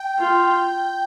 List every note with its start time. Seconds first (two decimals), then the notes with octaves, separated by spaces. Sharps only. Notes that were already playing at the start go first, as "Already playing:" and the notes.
Already playing: G5
0.19 F4